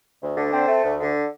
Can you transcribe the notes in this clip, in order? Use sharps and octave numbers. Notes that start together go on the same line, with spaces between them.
D2
D3
C4
A3
D2
D3